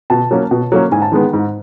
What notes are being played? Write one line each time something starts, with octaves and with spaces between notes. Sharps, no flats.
B2 A5
F#3 A#3 C#4
B2
F#3 A#3 C#4
G#2 G#5
A5
D#3 G#3 B3
G#2